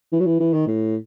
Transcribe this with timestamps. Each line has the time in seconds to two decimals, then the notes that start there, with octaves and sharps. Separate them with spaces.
0.12 E3
0.20 F#3
0.25 E3
0.40 E3
0.53 D#3
0.67 A2